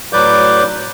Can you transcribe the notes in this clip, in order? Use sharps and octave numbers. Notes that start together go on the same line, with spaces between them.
A2 F#3 B4 D5 D6 G6